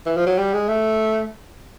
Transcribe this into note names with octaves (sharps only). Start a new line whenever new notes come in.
E3
F3
F#3
G3
G#3
A3